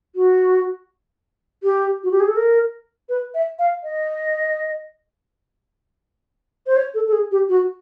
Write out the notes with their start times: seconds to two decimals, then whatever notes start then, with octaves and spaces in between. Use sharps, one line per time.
0.16 F#4
1.63 G4
2.04 F#4
2.11 G4
2.20 G#4
2.28 A4
2.36 A#4
3.09 B4
3.34 E5
3.59 F5
3.83 D#5
6.67 C5
6.76 C#5
6.94 A4
7.08 A4
7.13 G#4
7.32 G4
7.49 F#4